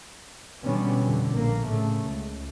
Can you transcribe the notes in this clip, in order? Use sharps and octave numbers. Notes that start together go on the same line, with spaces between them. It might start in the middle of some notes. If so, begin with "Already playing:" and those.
B2 D3 E3 G3 B3 C#4
F2 D3
A#1 A#3
A2 C#3 A3
C#2